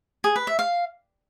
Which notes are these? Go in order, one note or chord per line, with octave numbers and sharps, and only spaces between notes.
G#4
B4
E5
F5